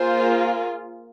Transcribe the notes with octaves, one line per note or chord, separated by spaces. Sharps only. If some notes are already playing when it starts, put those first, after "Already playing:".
Already playing: A#3 F4 G#4 C5